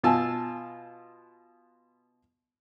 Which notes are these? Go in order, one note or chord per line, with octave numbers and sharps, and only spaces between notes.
B2 F4 G#5 A5 E6